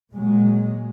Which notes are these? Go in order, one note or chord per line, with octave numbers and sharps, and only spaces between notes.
A#2 F#3 G#3